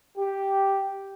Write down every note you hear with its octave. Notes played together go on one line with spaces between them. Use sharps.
G4